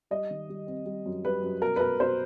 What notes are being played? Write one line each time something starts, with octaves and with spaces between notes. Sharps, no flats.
G3 D#5
D#3
G3
C4
G3
F#2
G3 B4
F#2
B2 A#4
B4
B2 A#4
B2 C5